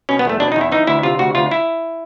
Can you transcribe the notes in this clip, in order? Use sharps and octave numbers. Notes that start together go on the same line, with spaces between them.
B2 C#4
B3
E2 A3
B2 D4
D#4
E2
E4
E3 D#4
D2 E4
C3 F4
D2 F#4
D2 F4
E4